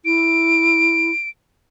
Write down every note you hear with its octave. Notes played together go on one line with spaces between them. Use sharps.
E4 D7